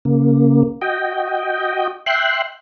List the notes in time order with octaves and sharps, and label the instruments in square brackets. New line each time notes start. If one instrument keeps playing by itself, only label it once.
[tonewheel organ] C#3 A#3
F#4 D#5 G5
E5 G5 C6 F#6